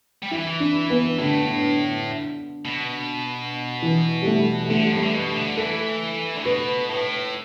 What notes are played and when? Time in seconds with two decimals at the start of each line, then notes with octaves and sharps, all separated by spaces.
0.22 G3
0.31 E3 E4
0.60 D4
0.90 B3
1.18 A2 D3
2.65 B2
3.82 E3
4.22 G3
4.26 A3
4.70 D3 A3
4.83 G3
4.92 A2 A3
5.03 D3
5.14 B2
5.36 D3
5.57 E3 A4
6.36 D3
6.45 B2 B4
6.89 A2